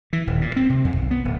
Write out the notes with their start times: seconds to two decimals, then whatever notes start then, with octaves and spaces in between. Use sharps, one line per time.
0.13 E3
0.27 D#1
0.41 A#2
0.56 C4
0.69 C3
0.84 F2
0.96 B1
1.11 B3
1.25 D1